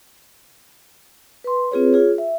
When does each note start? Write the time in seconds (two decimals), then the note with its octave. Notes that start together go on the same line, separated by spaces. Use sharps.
1.44 B4 C6
1.71 C4 F4 G#4 B4 C#5
1.93 F4 G#4 C#5
2.18 E5